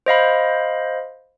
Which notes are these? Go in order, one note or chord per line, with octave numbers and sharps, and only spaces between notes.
C5 D#5 F5 B5